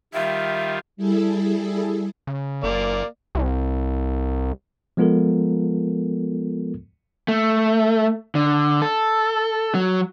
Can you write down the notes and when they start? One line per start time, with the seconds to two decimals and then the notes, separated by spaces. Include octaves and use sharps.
0.14 D#3 G3 F4 E5
0.97 G3 E4 G#4 A4
2.27 C#3
2.63 F#1 A#3 D5
3.35 C2
4.97 F3 G#3 B3 F4 A4 A#4
7.28 A3
8.35 D3
8.82 A4
9.75 F#3